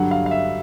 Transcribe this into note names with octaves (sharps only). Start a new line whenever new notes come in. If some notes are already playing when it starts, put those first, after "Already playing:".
Already playing: G2 D3 F#3 F#5
F5
F5
E5